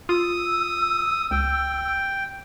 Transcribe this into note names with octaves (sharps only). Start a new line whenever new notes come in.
F4 D#6 E6
C#2 G5